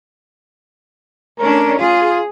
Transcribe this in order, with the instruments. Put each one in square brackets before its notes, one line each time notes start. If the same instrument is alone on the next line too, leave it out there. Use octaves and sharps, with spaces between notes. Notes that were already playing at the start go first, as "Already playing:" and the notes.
[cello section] A3 C#4 D4 [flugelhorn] A#4
[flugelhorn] F4 [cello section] G#4